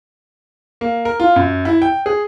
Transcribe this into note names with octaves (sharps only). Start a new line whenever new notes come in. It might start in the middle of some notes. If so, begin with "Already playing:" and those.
A#3
A#4
F4
F#2
E4
G5
G#4